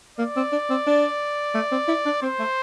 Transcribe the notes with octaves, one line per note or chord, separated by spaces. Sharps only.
A#3 D5
C4
D4
C4
D4
A3
C4
E4
D4
C4 C5
A3